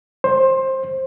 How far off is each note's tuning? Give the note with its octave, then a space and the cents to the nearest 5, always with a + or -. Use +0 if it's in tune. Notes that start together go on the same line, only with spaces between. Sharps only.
C5 +20